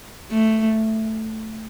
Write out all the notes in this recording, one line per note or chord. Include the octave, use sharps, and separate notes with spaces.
A3